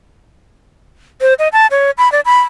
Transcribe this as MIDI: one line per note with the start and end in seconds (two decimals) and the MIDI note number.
1.21 1.34 72
1.39 1.48 75
1.53 1.67 81
1.71 1.91 73
1.98 2.11 83
2.12 2.21 74
2.25 2.41 83